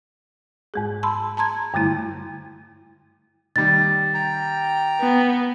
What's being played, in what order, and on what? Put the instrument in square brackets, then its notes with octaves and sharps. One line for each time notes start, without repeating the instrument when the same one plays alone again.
[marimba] G#2 G#3 G#4
A5 B5 C6 E6
A5 A#5 C6 G#6
G2 D3 G3 A3 E4
[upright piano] D#3 G3 [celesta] A6
[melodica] G5 A#5
[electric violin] B3